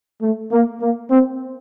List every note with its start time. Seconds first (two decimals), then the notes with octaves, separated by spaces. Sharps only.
0.22 A3
0.52 A#3
0.82 A#3
1.10 C4